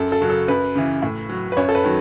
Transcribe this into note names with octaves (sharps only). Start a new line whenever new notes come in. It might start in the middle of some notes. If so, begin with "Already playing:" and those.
Already playing: F#2 A4
A4
C#3 F#3
A4
F#2 B4
C#3 E3
A2
F#3
B4
F#2 C#5
A4
B4
D#3 F#3